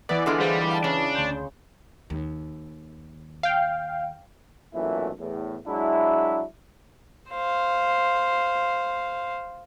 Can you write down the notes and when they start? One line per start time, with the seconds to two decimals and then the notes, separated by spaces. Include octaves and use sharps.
0.09 E3 B3 D5
0.26 D3 G#3 F4
0.40 G3 G#4 C5 F5
0.70 F5 A5
0.84 C#3 D4
1.15 D2 C6 G6
2.10 D#2
3.43 F5 G5
4.74 B1 F#2 A#2 E3 A3 E4
5.19 E2 A2
5.68 F#3 G#3 D4 E4
7.30 C5 F5